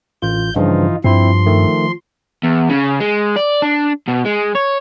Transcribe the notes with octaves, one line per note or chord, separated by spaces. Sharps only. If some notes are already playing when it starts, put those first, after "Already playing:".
A1 F4 G6
G2 C#3 E3 F3 D#4 F4
G2 F3 C4 E4 C6
D#3 A3
E2
C#3
G#3
D5
D4
B2
G#3
C#5